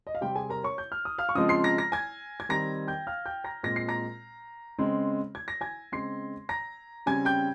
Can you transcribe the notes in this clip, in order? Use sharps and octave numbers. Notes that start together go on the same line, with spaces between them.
D#5
F5
C3 G3 C4 G4 G5
G#4 G#5
A#4 A#5
C#5 C#6
G6
F6
D#6
F5 F6
C#6
C#3 F3 G#3 C4 D#5 D#6
C6 C7
A#5 A#6
A#5 A#6
G#5 G#6
G#6
D#3 G3 C4 A#5 A#6
G5 G6
F5 F6
G5 G6
A#5 A#6
A#2 G#3 C4 A#6
C7
A#5 A#6
C#3 G#3 C4
G#6
A#6
G#5 G#6
C#3 G#3 C4 C6 C7
A#5 A#6
C#3 G3 C4 G#5 G#6
G5 G6